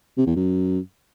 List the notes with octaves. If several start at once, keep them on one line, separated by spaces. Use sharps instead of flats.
C3
E2
F#2